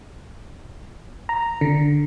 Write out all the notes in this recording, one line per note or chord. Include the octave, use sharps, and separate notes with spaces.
A#5
D3